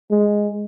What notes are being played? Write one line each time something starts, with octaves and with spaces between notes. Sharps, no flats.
G#3